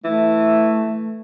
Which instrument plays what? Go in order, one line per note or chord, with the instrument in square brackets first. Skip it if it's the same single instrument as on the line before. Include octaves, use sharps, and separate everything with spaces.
[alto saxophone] E3 [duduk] A3